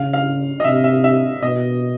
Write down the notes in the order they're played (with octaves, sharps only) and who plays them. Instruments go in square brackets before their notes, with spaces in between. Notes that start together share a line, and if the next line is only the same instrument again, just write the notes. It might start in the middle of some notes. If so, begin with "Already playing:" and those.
Already playing: [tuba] C#3 [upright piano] F5
[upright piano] F5
D#5
[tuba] C3 [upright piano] E5
[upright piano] E5
E5
[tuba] B2 [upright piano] D#5